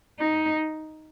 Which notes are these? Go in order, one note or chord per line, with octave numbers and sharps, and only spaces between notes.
D#4